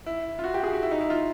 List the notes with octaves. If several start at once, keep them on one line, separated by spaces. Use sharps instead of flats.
E4
F4
F#4
G4
G#4
F#4
E4
D#4
E4
F4